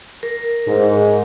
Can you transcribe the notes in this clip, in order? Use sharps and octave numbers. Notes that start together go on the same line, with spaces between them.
A#4
G#2